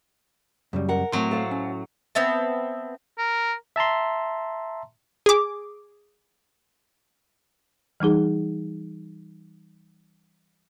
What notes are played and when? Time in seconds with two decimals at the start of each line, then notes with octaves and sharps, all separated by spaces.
0.73 F#2 C#3 G3
0.89 A#4 F#5
1.12 A2 F#3 A3 C4 C6
1.31 A4 C5 F5
1.51 C#4
2.15 B3 C4 E5 A5
3.18 A#4
3.76 E5 A5 A#5 C6
5.26 G#4 D6
8.00 E3 G3 D#4 G#4